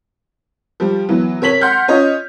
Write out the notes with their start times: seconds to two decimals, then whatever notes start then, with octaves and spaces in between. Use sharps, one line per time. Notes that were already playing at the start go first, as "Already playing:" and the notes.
0.80 F3 G3
1.09 E3 F#3 B3
1.41 C3 A#4 C#5 B6 F#7
1.61 F#5 C6 F6 G6
1.88 C#4 F4 C#5 D#5